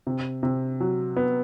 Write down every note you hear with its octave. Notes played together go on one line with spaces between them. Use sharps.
C3
C3
F#3
B3